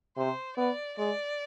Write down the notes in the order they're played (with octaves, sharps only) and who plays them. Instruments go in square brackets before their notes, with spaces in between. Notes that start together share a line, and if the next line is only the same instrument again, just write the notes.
[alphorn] C3 [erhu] C5
[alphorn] B3 [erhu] D5
[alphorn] G#3 [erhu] D5